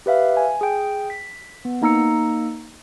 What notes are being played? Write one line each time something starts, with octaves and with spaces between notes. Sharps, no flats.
G4 B4 E5 F5
G#5
G#4 G5
B6
B3
A#3 D#4 A#5 E6 C#7